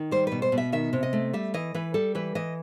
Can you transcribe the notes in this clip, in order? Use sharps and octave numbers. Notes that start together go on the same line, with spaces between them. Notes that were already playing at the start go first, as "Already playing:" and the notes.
Already playing: D#3
G3 C5
B2 B4
C5
B2
E5
D#3 E5
C3
D#5
A3
G3 E5
E3 D#5
E3 B4
G3 A4
E3 B4
E3 D#5